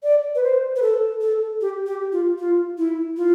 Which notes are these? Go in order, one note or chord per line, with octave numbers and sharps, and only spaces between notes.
D5
B4
C5
B4
A4
A4
G4
G4
F4
F4
E4
F4